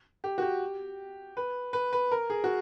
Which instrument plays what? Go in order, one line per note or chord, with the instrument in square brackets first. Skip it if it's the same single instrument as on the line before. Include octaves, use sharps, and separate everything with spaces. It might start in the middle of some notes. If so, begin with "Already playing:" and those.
[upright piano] G4
F#4
G4
B4
B4
B4
A#4
G#4
F#4